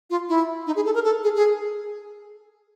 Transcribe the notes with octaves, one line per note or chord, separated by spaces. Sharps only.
F4
E4
D#4
G#4
A4
A#4
A4
G#4
G#4